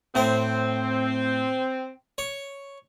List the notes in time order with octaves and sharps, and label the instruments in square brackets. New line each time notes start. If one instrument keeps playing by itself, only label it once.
[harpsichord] A2 C5 [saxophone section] C4
[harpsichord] C#5